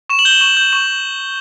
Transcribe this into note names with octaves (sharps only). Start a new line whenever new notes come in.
C#6 E7
F#7
G6 G7
C#6
G6
C#6